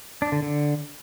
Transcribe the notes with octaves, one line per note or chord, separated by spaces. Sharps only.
D4
D3
D3